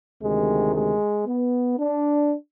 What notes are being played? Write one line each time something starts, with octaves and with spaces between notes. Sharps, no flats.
D2 C3 D#3 G#3
G#3
B3
D4